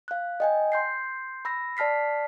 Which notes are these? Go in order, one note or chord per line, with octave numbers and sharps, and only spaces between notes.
F5 F#6
D#5 G5 G#5
C6 G6 C7
B5 E6 A#6
D5 A5 F6 B6 C7